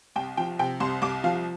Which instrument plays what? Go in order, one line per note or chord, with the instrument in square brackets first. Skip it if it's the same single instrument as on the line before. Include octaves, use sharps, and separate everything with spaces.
[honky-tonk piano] C2 G5
F3 G5
C3 G5
C2 C6
C2 D6
F3 F5